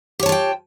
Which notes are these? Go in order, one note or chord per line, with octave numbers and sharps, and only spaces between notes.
F4 G4 C#5 G5 A5